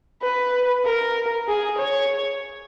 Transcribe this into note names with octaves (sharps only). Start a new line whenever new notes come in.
B4
A#4
G#4
C#5